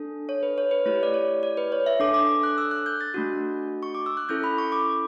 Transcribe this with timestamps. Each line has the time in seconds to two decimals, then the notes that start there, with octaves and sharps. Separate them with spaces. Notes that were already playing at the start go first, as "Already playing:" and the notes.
Already playing: D4 A4
0.29 C#5
0.43 B4
0.58 C#5
0.71 B4
0.86 A3 E4 G4 C#5
1.03 D5
1.14 C#5
1.43 D5
1.57 B4
1.72 C#5
1.86 E5
2.00 D4 A4 D6
2.14 D6
2.29 D6
2.43 F#6
2.58 E6
2.71 F#6
2.86 G6
3.01 A6
3.14 A3 D4 F#4
3.83 C#6
3.95 D6
4.06 E6
4.17 F#6
4.29 C#4 E4 A4 G6
4.44 B5
4.58 C#6
4.72 D6